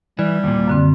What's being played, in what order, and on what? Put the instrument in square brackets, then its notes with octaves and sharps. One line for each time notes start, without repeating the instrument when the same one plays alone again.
[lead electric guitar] E3 [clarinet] G3
[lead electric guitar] D#2 A#2
[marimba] F#2 D3 C4